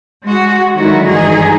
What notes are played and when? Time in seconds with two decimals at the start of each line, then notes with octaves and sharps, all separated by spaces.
0.25 G#3 F#4
0.75 D3 D#3 F#3 G#3 E4 F#4
1.10 G2 D#3 E3 D#4 G#4